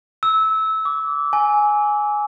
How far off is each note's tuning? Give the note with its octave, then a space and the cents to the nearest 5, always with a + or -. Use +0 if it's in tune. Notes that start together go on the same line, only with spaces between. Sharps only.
E6 -20
D6 -25
G#5 +5